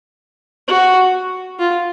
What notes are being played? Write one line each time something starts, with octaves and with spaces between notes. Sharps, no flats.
F#4
F4